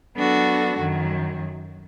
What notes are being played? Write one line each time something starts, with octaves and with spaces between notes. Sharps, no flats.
F#3 B3 D4 F#4 A4
F#2 D#3 F#3